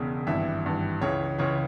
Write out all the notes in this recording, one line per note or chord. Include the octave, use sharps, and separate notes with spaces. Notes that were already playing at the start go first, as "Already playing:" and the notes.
Already playing: E1 E2 C#3
G#1 G2 E3 E5
G#1 G2 E3
C#2 C#3 E3 C#5
C#2 C#3 E3 C#5